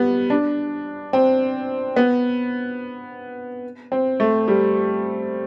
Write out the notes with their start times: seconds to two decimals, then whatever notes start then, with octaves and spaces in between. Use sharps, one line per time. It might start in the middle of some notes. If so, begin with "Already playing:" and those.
Already playing: G3 B3
0.30 D4
1.13 C4
1.96 B3
3.92 C4
4.20 A3
4.48 G3